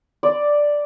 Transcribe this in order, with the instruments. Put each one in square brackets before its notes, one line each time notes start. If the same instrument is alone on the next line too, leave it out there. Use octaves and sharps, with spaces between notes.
[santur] D5